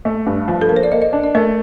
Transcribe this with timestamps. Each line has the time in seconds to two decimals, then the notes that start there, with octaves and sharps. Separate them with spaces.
0.05 A3
0.26 G2
0.48 F3
0.61 A4
0.69 A#3 A#4
0.76 C5
0.83 D5
0.92 A#3 D#5
1.02 D#5
1.12 D4 D5
1.23 D5
1.35 A3 A#4